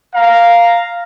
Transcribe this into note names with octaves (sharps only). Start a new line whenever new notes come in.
F5 A#5